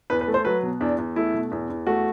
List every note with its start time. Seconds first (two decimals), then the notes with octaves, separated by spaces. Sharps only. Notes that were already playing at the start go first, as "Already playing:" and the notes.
0.10 E2 B4
0.21 B4
0.28 A3
0.34 C5
0.45 F#3 B4
0.63 B2
0.80 E2 D4
0.98 E2
1.16 A3 E4
1.34 B2
1.51 E2
1.69 E2
1.87 A3 F#4